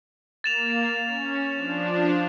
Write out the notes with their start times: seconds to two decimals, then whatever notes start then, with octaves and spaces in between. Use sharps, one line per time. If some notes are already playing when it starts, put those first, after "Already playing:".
0.44 A#3 A6 E7 F7
1.06 C#4
1.53 F3 D4